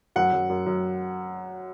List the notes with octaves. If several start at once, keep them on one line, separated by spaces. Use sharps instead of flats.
F#2 F#5
F#2
F#2
F#2